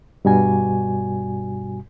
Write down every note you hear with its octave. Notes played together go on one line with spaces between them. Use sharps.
G2 B2 G3 F#4 G#5